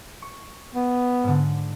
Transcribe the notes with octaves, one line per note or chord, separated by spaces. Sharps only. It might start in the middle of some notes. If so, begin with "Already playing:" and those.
C#6
B3
G#2 D3